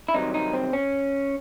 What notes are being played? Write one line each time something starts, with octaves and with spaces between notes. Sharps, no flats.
E4
C2 C3 D#3 F#3 D#4
D#4
C4
C#4